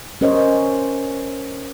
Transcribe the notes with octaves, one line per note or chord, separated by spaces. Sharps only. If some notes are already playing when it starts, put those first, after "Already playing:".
C#4 A#4 C5 C#5 D#5